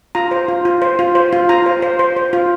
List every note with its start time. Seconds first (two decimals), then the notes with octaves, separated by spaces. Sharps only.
0.15 F4 A#5
0.31 C5
0.48 F4
0.65 F4
0.82 C5
0.99 F4
1.15 C5
1.33 F4
1.49 F4 A#5
1.66 C5
1.82 C5
1.99 C5
2.17 C5
2.33 F4